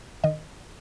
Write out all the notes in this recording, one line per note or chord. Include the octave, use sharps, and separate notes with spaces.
D#3 D#5